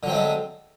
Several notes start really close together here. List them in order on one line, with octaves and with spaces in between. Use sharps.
D3 F#3 C4 A3 G#3